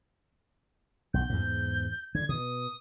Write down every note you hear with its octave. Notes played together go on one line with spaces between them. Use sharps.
B1 G6
E2 G#2
D3 G#6
B2 D#6